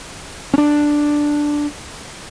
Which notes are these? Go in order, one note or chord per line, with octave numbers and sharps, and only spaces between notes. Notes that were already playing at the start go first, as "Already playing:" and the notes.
C#4 D4